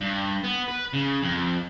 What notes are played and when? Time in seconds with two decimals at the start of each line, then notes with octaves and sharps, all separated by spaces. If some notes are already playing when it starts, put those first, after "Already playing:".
0.01 G2
0.44 B3
0.68 B4
0.93 C#3
1.23 F2